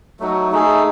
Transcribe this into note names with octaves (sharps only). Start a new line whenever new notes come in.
F#3 A3 D#4 F#4
A3 D#4 G#4